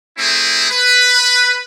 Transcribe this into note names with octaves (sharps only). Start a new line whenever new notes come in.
A3 C4 E4 G#4
B4